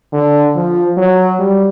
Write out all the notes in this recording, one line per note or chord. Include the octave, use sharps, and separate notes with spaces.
D3
F3
F#3
G3